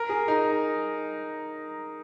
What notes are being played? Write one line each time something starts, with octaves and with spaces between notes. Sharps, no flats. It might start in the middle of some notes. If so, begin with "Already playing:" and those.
Already playing: A#4
G#4
D#4